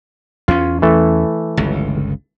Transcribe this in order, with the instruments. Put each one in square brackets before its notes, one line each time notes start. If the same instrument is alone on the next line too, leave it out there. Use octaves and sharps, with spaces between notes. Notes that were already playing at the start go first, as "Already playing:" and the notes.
[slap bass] E2 C#4 [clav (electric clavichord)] F4
[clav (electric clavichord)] E3 A3 A4
[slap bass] G1 C#2